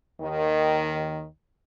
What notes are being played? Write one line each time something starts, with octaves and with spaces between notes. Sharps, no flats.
D#2 D#3